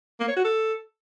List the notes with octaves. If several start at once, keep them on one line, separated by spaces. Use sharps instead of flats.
A#3
C#5
F#4
A4